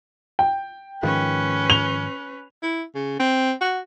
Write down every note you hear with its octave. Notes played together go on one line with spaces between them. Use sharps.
G5
G#2 D#3 F3 C#4 B4
F7 G7
E4
C#3
C4
F#4